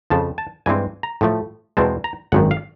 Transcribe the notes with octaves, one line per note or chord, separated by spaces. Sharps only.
F2 C#3 F3 A5
A5
G2 E3 G#3 C4 G#5
A#5
A2 F3 A3
E2 B2 G#3 C4 A5
A#5
G#1 F#2 D#3 F#5
F5